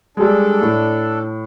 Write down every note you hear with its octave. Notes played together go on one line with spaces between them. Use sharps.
G3 G#3 D4 A4
A2